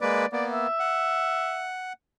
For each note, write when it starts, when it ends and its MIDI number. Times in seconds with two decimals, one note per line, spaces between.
0.01 0.26 56
0.01 0.26 58
0.01 0.26 71
0.01 0.25 74
0.32 0.67 58
0.32 0.67 59
0.32 0.45 74
0.52 1.70 76
0.80 1.93 78